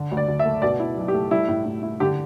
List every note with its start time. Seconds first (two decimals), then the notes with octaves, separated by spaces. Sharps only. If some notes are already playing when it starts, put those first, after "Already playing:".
Already playing: D3
0.11 D2
0.17 D5
0.28 D2
0.39 E5
0.45 A3
0.62 B2 D5
0.80 E4
0.97 B1
1.08 G4
1.14 A3
1.31 G3 E4
1.48 A2
1.66 A2
1.83 E4
2.00 D3 G4